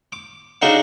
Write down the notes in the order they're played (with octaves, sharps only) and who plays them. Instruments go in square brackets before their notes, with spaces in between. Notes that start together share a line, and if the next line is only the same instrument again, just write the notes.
[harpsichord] D6
C#3 D4 D#4 F#4 F5